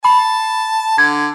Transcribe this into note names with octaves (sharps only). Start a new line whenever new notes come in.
A5 B5
D3 G#6